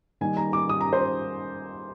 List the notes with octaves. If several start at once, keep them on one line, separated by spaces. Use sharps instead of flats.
D#3 G3 A#3 D#4 G#5
A#5
D6
D#6
A#5
C5